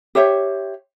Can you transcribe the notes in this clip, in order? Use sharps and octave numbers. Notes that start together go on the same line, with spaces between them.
G4 C5 C#5 E5